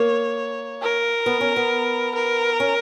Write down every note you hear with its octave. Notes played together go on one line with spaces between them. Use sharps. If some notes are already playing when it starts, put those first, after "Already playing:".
Already playing: A#3 C#5
A#4
B3
C#4
B3
A#4
C#4